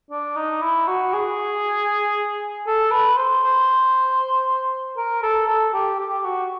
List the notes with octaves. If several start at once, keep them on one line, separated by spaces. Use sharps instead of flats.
D4
D#4
E4
F#4
G#4
A4
B4
C5
C5
A#4
A4
A4
G4
G4
F#4